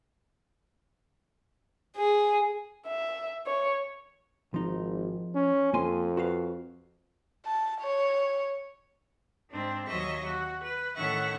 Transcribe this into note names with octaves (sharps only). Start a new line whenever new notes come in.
G#4
E5
C#5
G#1 F3 D#4
C#4
F2 A#3 G#5 C6
F#4 B4 F5
A5
C#5
G#2 C4 D4
D#2 F#3 D#5 E5 C#6
F#4
B4
A2 D#3 C#4 E5 F#5 C#6